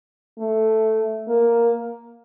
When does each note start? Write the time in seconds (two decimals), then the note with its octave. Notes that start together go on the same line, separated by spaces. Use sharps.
0.39 A3
1.28 A#3